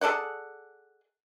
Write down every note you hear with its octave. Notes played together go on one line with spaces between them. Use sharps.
G#4 A4 D5 F#5